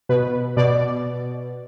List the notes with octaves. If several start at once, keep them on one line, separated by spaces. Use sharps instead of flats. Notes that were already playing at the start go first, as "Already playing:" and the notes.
B2 B4
B2 D5